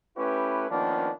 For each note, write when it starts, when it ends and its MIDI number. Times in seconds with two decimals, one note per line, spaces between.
0.17 0.67 57
0.17 0.67 61
0.17 0.67 64
0.17 0.67 67
0.17 0.67 71
0.70 1.09 51
0.70 1.09 53
0.70 1.09 58
0.70 1.09 59
0.70 1.09 61
0.70 1.09 62